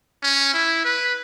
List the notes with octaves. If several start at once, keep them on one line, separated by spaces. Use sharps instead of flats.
C#4
E4
B4